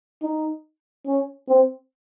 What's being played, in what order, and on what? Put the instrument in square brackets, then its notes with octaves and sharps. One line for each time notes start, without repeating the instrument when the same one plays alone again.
[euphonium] D#4
C#4
C4